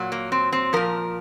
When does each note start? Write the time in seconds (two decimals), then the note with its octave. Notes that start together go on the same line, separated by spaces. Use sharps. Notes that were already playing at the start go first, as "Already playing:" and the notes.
Already playing: A#2 F#3
0.12 A#3
0.32 C4
0.53 C4
0.73 A#2 F3 A#4